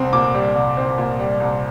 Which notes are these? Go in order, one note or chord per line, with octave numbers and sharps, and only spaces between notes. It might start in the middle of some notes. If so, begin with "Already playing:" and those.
Already playing: C2 C4
A#2 D6
G3
C2
C4
A#2
G3
C2